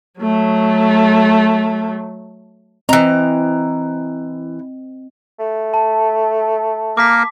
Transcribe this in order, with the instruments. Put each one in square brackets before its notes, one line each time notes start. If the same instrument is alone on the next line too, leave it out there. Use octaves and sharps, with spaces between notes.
[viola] F#3 A3
[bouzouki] E3 A#5 [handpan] C4 D#5
[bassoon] A3
[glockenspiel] A5
[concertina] A#3 A#4 [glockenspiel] D6 B6